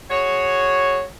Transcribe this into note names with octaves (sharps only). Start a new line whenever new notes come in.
F#4 G#4 C#5